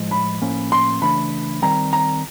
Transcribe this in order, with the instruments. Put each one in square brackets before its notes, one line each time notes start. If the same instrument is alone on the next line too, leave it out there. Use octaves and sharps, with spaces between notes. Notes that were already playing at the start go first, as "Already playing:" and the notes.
Already playing: [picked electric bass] A2 F3 G#3
[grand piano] B5
[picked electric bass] A2 F3 A#3 C#4
[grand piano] C6
[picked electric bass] C#3 E3 A3 D4 [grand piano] B5
[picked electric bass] D#3 G3 C4 [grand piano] A#5
[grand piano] A#5